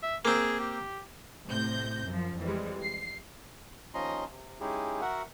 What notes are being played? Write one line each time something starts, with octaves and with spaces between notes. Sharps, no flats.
E5
A#3 C4 G#4
G4
A2 C3 C5 G6 A#6
F#2 F3
F2 E3 G3 G#3
C7
D#2 F3 C#4 D#5 A#5 C6
C3
G#3 C#4 D#4 E4 G4 G#4
F#4 A#4 E5 F#5